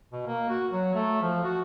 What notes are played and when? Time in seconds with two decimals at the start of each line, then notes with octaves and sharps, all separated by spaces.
0.13 B2
0.26 A#3
0.49 F#4
0.72 F#3
0.94 A3
1.22 F3
1.44 F#4